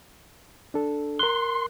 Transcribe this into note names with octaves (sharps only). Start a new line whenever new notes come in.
D4 A4
A#4 C6 F#6